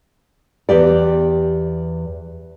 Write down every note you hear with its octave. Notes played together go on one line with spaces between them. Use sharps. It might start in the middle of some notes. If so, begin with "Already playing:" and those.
E2 G4 D5